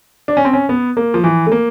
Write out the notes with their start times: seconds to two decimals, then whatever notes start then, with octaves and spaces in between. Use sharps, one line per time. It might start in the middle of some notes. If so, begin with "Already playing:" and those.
0.28 D4
0.37 C#4
0.45 C4
0.53 C#4
0.69 B3
0.97 A#3
1.14 F3
1.24 E3
1.47 A3
1.52 A#3